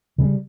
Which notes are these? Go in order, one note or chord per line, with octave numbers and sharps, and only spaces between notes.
C#3 G3 G#3